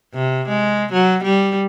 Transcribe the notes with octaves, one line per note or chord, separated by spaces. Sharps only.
C3
G#3
F#3
G3